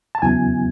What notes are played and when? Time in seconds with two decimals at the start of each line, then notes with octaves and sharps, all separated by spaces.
0.15 A5
0.22 E2 C#3 F#3 B3 E4 G#5